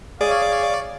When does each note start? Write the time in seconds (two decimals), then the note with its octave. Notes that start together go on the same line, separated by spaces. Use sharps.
0.21 G#4 C#5 D5 F5